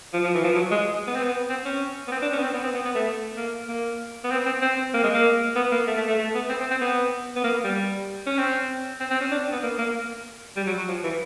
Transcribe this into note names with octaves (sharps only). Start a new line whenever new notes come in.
F3
F3
E3
F3
F#3
G#3
B3
C4
B3
C4
C#4
B3
C4
D4
C#4
B3
C4
B3
C4
B3
B3
A3
A#3
A#3
B3
C4
C4
C4
A#3
G#3
A#3
B3
A#3
A3
A3
A3
A3
B3
C4
C4
C4
B3
B3
A#3
G3
C#4
C4
C4
C4
C#4
D4
B3
A#3
A#3
G3
F#3
F#3
F3
E3